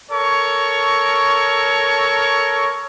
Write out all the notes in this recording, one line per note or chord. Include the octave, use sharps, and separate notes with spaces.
A4 A#4 C#5 C#6